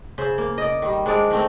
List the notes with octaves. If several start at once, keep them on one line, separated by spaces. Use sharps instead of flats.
C#3 C5 E5
A#3
D5 D#5
D#3 G3
G#3 C4 D4 D5
D#3 A3 C4